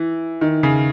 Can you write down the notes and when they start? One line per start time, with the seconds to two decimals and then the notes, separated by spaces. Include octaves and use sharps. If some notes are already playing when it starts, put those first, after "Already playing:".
Already playing: E3
0.41 D#3
0.63 C#3